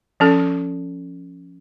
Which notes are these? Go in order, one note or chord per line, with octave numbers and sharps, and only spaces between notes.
F3 C#4 A4